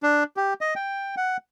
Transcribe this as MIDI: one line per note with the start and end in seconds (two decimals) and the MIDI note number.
0.03 0.24 62
0.37 0.54 67
0.61 0.74 75
0.76 1.15 79
1.17 1.37 78